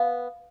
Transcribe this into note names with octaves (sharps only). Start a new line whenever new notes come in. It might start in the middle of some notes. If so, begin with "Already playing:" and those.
Already playing: B3 F5